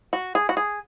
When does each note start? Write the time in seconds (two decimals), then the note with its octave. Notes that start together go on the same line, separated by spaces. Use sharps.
0.13 F#4
0.35 G#4
0.49 F#4
0.57 G#4